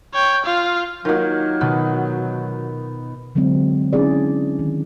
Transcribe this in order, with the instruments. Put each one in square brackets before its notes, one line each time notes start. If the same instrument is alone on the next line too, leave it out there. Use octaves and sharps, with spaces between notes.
[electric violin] C#5 G5
F4 F5
[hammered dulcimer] D#3 A#3 [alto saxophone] F#3 [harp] F4
[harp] B2 D#3 [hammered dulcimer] B3
[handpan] D3 F#3 G#3 C4
C#4 D4 E4 G#4 D5
D#3